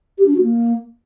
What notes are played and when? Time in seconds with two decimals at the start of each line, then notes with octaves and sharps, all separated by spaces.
0.18 G4
0.26 D4
0.34 F#4
0.42 A#3